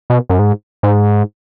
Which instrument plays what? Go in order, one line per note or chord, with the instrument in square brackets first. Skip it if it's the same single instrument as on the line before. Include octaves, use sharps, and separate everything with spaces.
[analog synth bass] B2
F#2
G#2
G#2